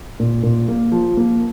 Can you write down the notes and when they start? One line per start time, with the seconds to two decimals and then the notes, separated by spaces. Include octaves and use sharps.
0.20 A#2
0.43 A#2
0.68 A#3
0.92 F3
1.17 A#3